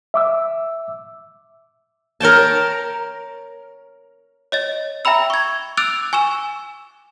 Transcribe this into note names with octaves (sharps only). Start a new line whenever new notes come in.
E5 D6 E6
A#4 C#5 G5 A5
C#5 D#5 A6
E5 G5 A#5 B5 E6
C#6 G#6
D6 E6 F#6 A6 D7 F7
G#5 C#6 E6 E7